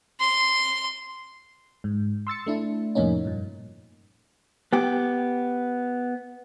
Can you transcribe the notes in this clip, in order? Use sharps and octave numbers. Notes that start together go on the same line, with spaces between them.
C6
G#2
C6 E6 A6 C#7
A3 D4 E4
F2 A2 C3 A#3 C#4 D#4
G2 A#2
B3 G4